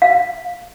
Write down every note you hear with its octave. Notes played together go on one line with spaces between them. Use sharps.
F5